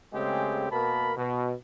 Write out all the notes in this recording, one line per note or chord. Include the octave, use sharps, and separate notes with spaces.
C#3 G#3 A3 C4 G4 G#4
B2 A#3 A#4 A5 B5
B2